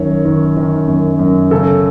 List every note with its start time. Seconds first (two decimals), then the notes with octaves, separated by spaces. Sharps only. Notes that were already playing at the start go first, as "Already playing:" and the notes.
Already playing: F#2 D#3 C#5
0.25 D#3
0.57 D#3
0.88 F#2
1.19 F#2
1.51 C#3 A4